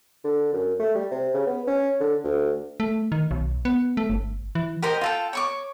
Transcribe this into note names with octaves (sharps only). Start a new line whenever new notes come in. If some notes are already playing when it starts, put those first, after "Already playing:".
D3
F#2
A3
G3
C3
C#3
B3
C#4
D3
D2
A3
D#3
B1
B3
A3
G1
E3
G4 A#4 C5 D#5
F4 A4 G5
C#5 C#6 D6